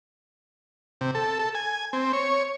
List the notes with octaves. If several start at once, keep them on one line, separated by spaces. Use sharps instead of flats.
C3
A4
A4
G#5
C4
C#5